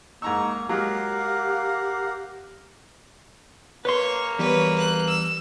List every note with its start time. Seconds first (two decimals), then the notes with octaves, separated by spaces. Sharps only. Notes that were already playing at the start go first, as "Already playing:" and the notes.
0.22 G#2 A#3 D#4 A#5 C#6 E6
0.69 F#3 G#3 A#3 G4 A#4 F5 F#5
3.85 A#3 B4 C#5 C6
4.39 E2 G3 B4 C#5
4.78 F#6
5.07 E6